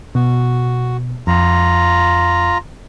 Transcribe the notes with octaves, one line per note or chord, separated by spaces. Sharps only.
B2 F#4
F2 F4 A#5